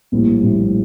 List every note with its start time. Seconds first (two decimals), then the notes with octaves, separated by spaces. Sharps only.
0.12 A#1 A2 G3 A#3 E4
0.41 A#1 A2 G3 A#3 E4